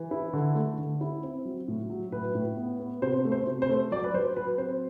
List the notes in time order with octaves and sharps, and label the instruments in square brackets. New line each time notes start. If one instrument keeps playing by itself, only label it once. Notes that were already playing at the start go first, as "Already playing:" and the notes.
Already playing: [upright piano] E3
E4
D3
A3
D3
E4
C4
F#3
A2
F#3
A2 B4
A2
B3
B3
C3 C5
A3
C5
C3
C5
A3
F#3 D5
B4
F#3 C5
F#3 B4
C4 C5